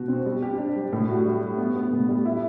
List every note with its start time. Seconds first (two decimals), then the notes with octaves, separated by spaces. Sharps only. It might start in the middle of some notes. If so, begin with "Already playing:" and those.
Already playing: B2 F#4
0.08 C4
0.26 G3
0.42 G4
0.58 D4
0.76 G3
0.92 A2
1.09 F#4
1.25 G3
1.41 G3
1.58 B3
1.76 B3
1.92 A2
2.08 G3
2.26 E4